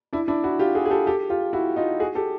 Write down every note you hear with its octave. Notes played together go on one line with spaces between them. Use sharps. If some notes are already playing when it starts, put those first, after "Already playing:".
D4 E4
D4 E4
E4 F#4
F4 G4
F#4 G#4
G#4
G4 A4
G4 A4
F4 G4
E4 F#4
D#4 F4
F#4 G#4
G4 A4